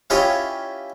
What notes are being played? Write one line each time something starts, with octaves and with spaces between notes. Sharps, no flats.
C#4 E4 F4 G4 C#5 D#5